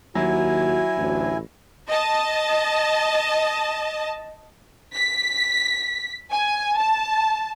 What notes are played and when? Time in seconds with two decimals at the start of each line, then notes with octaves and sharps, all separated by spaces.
0.15 D#2 F#3 E4 F#4 G#5
0.97 A1 D2
1.89 D#5 A5
4.94 B6
6.31 G#5
6.78 A5